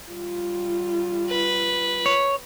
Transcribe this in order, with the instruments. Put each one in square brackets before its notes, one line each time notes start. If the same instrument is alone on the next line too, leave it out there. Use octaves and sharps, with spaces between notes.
[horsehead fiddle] G3 F4
[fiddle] B4
[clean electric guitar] C#5